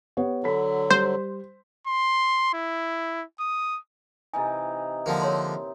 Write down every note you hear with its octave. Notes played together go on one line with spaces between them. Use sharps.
B3 G4 C#5
D3 F#3 A4 B5 B6
G3 C5
C6
E4
D#6
C3 E3 D#4 E4 G#5
D3 F3 A#3
A#4 C#5 C6